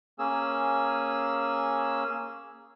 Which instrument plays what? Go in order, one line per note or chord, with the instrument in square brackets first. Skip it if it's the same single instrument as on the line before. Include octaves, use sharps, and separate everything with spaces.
[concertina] A#3 C#4 G#4 E6